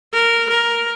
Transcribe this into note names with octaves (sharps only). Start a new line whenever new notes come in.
A#4
A#4